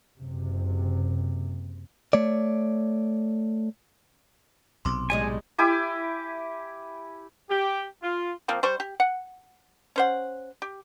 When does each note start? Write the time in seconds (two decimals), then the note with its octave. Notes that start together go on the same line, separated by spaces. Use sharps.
0.19 F#1 C3
2.13 A3 C#5 D5
4.85 B1 C3 C6 D6
5.10 A2 G3 G#3 G#5
5.58 E4 G4 G#5 D6
7.49 G4
8.03 F4
8.48 F3 A#3 C4
8.63 G3 C5 C#6
8.80 G4
9.00 F#5
9.96 C#4 C5 F#5
10.62 G4